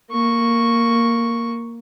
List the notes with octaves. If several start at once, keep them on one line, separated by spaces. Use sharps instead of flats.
A#3 C#6